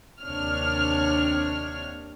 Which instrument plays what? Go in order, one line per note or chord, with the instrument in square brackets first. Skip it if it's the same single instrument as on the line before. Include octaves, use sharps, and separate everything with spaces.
[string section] D#2 C3 D4 C#5 F6